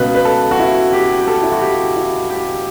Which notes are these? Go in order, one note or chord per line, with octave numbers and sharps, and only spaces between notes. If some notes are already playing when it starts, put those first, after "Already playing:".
Already playing: C#2 B2 B4
B4
A4
F#4
E4
G4
G4
A4
E4
F#4
G4
E4
G4